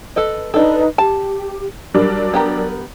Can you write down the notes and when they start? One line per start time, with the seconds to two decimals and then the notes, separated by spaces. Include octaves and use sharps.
0.16 A4 B4 D#5
0.54 D4 D#4 A4 B4 D#5
0.98 G4 A5
1.94 F#3 G3 D4 A#4
2.34 B3 G4 A#5